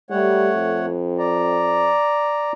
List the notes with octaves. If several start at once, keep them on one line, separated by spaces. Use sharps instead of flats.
G3 A3 C#5 F#5
F2
D5 A#5